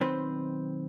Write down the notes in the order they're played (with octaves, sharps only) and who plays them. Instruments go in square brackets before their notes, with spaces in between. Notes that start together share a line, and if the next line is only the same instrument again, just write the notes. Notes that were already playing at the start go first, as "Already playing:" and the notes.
[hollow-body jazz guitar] B1 D#3 C4 B4 C5